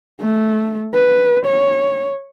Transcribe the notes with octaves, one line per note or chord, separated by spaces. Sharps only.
A3
B4
C#5